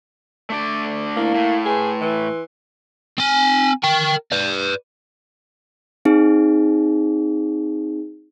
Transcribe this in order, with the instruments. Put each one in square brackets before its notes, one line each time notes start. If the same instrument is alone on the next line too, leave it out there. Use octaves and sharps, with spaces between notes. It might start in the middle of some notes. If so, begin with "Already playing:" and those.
[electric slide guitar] A3 D4 D5
[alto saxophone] A#3 [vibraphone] E4 F5
[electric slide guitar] A2
[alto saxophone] G#4 [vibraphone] B4 C6
[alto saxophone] E3
[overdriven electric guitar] C4 G#5
A#4 G5
B4 D5
[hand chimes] C4 D#4 G#4